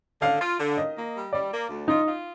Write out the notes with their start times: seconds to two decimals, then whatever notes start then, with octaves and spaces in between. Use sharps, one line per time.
0.22 D3 F5
0.40 F4
0.59 D3
0.77 D#3 D#5
0.96 A#3
1.15 G3
1.33 G3 D5
1.52 A#3
1.69 D2
1.88 D#4 F4
2.06 F4